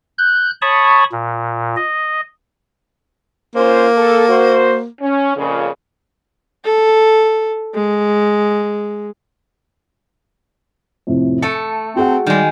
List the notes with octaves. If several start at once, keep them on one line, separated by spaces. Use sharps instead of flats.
F#6 G6
C#5 A5 B5 C#6 D#6
A#2
D#5
A#3 C#4 F4 C5
A4
F#4 C5
C#4
F2 A#2 C#3
A4
G#3
F2 A2 C3
A3 A4 C#7
C4 F#4 G#4 F#5
D#3 G3 G#3